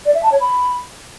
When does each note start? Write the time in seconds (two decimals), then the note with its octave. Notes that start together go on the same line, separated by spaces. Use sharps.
0.06 D5
0.14 E5
0.23 A5
0.32 C#5
0.41 B5